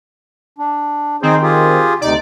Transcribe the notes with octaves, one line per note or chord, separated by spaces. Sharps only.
D4
D#3 C4 D#4 G#4 C5
F4 G4 G#4
D2 C3 D#4 D5